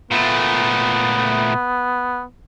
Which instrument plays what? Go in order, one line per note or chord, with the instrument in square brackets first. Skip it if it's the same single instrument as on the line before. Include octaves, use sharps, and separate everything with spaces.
[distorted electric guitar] A#2 A3 [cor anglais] B3